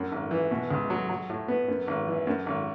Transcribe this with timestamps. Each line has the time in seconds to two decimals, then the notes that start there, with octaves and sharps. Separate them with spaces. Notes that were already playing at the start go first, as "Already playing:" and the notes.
Already playing: F#2
0.12 G#1
0.31 E3
0.51 B2
0.71 C#2
0.90 F#3
1.09 F#3
1.30 A2
1.48 B3
1.68 F#2
1.87 G#1
2.07 E3
2.27 F#2
2.46 G#1